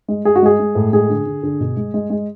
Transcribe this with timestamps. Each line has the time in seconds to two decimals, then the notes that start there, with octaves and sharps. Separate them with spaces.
0.08 G#3
0.25 G#3 G#4
0.36 F#4
0.43 G#3 G#4
0.60 G#3
0.75 A2
0.93 G#3 G#4
1.09 D3
1.26 D3
1.43 D3
1.60 B2
1.77 G#3
1.94 G#3
2.10 G#3